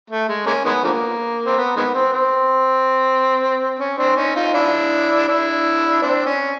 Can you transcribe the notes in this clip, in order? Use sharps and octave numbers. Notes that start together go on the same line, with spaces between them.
A3
G#3
G#3 A#3 C#4
D#3 G#3 B3
D3 F3 A#3
C4
B3
D#3 G#3 B3
C4
C4
C#4
C4 D4
C#4 D#4
D#4 F4
D4 E4
D4 E4
C4 D4
C#4